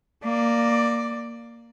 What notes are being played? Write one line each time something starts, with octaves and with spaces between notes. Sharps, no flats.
A#3 D5